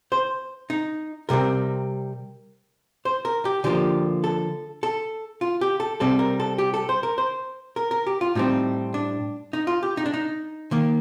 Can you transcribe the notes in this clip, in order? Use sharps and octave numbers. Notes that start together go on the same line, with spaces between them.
C5
D#4
C3 G3 C4 A#4
C5
A#4
G4
D3 F3 A#3 G4
A4
A4
F4
G4
A4
C3 G3 C4 A4
A#4
A4
G4
A4
C5
A#4
C5
A#4
A#4
G4
F4
A2 G3 C4 D#4
D4
D#4
F4
G4
D#4
D4
D#4
D#3 A#3